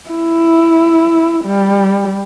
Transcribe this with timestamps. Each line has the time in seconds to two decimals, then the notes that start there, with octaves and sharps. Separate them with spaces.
0.10 E4
1.45 G3